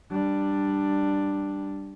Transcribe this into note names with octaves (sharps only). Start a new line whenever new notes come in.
G3 D4